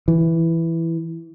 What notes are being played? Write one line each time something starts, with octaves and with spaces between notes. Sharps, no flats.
E3